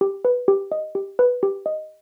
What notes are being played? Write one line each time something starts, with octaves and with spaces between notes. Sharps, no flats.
G4
B4
G4
D#5
G4
B4
G4
D#5